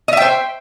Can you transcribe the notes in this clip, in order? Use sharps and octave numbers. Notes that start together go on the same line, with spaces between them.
C5 D#5 E5 G5